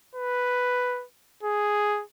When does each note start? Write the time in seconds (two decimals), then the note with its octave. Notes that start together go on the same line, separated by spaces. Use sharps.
0.15 B4
1.43 G#4